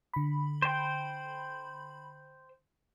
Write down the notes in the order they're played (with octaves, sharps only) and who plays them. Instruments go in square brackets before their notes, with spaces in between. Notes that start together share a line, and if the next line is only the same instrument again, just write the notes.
[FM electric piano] D3 B5
[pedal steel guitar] C5 G5